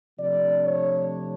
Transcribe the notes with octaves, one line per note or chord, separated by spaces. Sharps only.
C3 F3 A3 D4 D5
C#5